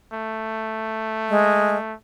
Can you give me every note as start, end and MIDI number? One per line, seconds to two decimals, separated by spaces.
0.13 1.94 57
1.29 1.76 56